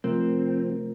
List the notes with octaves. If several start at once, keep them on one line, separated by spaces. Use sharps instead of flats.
C3 F3 A3 C4 A#4